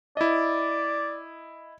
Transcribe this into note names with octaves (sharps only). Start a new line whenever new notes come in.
E4 D5 D#5